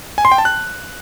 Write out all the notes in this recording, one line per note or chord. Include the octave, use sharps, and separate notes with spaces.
G#5
C6
G5
A5
F#6